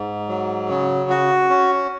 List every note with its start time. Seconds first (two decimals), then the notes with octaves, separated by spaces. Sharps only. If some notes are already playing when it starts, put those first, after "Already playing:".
Already playing: G#2
0.28 F#3
0.69 C#3
1.10 F#4
1.50 C#4